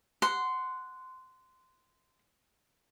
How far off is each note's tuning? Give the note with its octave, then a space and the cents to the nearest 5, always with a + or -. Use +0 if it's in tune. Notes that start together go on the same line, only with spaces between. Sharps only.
F#5 +0 C6 -15